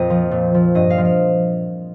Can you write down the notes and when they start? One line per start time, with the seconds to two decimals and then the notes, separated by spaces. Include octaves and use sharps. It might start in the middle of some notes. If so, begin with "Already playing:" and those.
Already playing: F2 A#2 D#5 G5
0.10 F3
0.31 A#2
0.54 F3
0.75 G2 D#5
0.90 F5
0.98 F3
1.05 F5